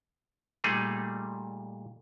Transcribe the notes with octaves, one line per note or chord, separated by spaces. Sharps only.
A#2 G3 A3 D#4 G#4